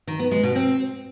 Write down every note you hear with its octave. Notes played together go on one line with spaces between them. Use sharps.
D#3
B3
G#3
B2
C4